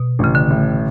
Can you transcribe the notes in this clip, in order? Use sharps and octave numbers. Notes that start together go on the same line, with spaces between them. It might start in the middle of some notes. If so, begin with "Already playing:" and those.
Already playing: B2
A1 C#3
D3
A2